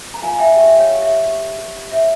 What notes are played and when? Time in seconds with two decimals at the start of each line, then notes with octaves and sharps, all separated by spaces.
0.14 A#5
0.22 F4 F5 G#5
0.39 E5 G5
0.56 G4 E5 G5
0.68 E5
0.79 C#5 F5
0.90 G4
1.02 E5
1.24 G4
1.58 G4
1.92 C#5 E5